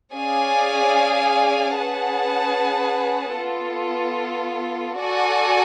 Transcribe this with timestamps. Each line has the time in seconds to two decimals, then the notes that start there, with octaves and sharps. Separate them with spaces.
0.16 C#4 G#4 D5 F5 G#5
1.77 C#4 G#4 B4 F#5 A5
3.39 B3 F4 A4
5.00 F#4 A4 D5 G#5